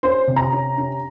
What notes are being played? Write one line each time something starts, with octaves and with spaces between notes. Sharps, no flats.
C#4 C5
C3
A#5
C#4
C#4